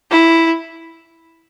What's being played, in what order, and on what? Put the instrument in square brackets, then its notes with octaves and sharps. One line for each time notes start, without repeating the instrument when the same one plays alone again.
[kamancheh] E4